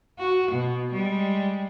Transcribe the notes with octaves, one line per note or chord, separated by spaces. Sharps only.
F#4
B2
G3 G#3